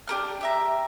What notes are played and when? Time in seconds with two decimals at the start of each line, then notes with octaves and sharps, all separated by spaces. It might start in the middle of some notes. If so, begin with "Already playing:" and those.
0.07 D4 G4 A#4 F6
0.41 G4 E5 A#5